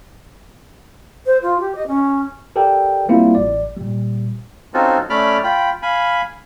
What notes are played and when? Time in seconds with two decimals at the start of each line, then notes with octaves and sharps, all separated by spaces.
1.26 C5
1.42 F4
1.60 G4
1.75 D#5
1.87 C#4
2.56 G4 A4 A#4 D5 G5
3.09 G3 A#3 C4 E4 F4
3.35 A1 D5
3.77 A#2 G3
4.74 C4 C#4 D#4 F4 F#4 A4
5.10 A3 C#4 D5 B5 D6 F6
5.43 F4 G5 B5
5.82 F5 G#5 B5